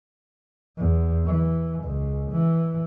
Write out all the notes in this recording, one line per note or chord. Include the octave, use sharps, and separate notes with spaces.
E2
E3
C#2
E3